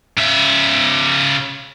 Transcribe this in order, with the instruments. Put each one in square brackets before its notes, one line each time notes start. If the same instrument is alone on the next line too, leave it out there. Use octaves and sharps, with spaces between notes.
[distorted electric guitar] C#3 E5